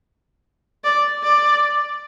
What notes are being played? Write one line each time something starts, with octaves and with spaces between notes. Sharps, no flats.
D5
D5